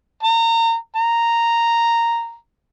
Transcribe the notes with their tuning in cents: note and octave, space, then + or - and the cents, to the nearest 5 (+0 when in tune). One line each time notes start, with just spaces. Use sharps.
A#5 -30
A#5 -5